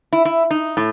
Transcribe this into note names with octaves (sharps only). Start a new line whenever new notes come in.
E4
E4
D#4
A2